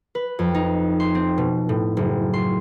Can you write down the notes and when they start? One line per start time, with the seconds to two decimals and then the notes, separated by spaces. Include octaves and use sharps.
0.15 B4
0.39 F2
0.55 D#4
1.00 C6
1.15 C4
1.38 B2
1.69 A2
1.97 F#1
2.34 C6